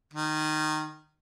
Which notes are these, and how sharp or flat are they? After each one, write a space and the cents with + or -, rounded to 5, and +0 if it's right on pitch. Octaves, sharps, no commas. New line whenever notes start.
D#3 -15